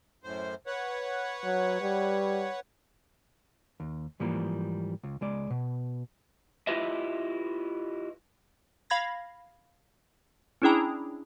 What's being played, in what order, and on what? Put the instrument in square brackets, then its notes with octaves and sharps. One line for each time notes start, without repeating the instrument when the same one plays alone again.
[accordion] F#2 A2 C5
B4 C#5 F#5
[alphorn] F#3
G3
[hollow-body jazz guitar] D#2
G#2 E3 F3 G3 A#3
C#2
C#2 G#3 D5
B2
[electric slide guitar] E4 F4 G4 B4 D#5 E5
[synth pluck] F5 B5 G#6 A#6
C#4 D4 E4 G#4 G5 A#5